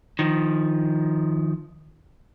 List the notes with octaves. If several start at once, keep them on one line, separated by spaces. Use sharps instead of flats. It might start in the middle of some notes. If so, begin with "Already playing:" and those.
D#3 F3